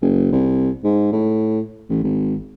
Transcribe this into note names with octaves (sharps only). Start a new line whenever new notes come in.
F#1
C2
G#2
A2
A1
G#1